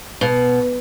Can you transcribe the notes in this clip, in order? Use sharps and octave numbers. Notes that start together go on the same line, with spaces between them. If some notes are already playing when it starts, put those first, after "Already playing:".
B2